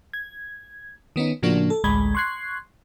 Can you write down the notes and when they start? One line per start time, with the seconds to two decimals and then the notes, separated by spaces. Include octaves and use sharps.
0.13 G#6
1.16 D#3 B3 C#4 D#4
1.43 A2 C#3 F3 A#3 D4 F#4
1.70 A4
1.84 A1 D2 G#3 B5 G#6
2.15 C6 C#6 F#6 G#6 C7